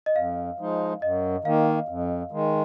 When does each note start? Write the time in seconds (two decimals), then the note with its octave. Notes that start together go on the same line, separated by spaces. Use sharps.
0.06 D#5
0.16 F2 F5
0.59 F3 G#3 D#4
1.02 F#2 D#5
1.44 D#3 A#3 F5
1.88 F2
2.31 D#3 G#3